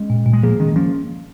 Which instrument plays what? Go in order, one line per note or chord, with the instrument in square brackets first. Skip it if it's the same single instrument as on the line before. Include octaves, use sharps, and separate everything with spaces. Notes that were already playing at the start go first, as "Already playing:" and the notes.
Already playing: [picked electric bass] G#3 C#4
[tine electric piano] A#2
A#2
[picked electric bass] G#3
[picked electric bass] F3 A#3 [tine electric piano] G#4
[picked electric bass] D#3 G#3 [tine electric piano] C#4
[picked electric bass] F3 A#3 [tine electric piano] C#4